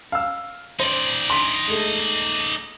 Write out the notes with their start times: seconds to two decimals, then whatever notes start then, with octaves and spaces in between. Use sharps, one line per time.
0.12 F5 E6
0.80 D#4 C5 D5
1.30 C6 B6
1.68 G#3 A3